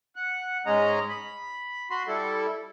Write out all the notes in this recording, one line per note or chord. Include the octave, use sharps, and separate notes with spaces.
F#5
G#2 G#3 C#4 D#5 A#5
B5
F#4 B5 C6
G3 E4 A4